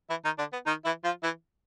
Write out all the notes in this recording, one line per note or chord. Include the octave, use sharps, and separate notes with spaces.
E3 E4
D#3 D#4
D3 D4
B3
D#3 D#4
E3 E4
F3 F4
E3 E4